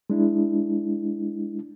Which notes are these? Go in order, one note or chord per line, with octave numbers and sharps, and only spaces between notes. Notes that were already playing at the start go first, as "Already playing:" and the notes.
G#3 D4 E4